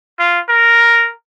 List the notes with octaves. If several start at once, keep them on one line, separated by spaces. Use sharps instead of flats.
F4
A#4